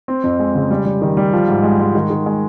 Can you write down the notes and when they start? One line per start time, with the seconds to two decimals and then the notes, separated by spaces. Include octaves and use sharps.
0.08 C4
0.24 F2
0.39 G#3
0.55 C#3
0.71 G3
0.85 G3
1.02 D#3
1.17 G3
1.33 F3
1.48 G#2
1.63 G#3
1.79 G#3
1.95 D#3
2.10 D#3
2.26 G#3